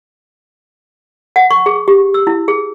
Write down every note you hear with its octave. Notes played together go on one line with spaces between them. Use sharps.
F#5
C#6
G#4
G4
E6
E4
G#4